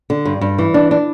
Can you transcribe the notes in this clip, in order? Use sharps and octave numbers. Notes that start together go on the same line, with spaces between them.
D3
G2
G2
E3
D4
D4